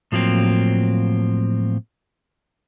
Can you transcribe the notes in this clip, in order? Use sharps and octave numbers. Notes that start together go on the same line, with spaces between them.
A2 F3 F#3 A#3 C4